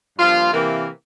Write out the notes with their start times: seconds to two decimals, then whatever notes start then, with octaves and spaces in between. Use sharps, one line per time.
0.18 G2 F3 A#3 F4
0.53 C3 E3 A#3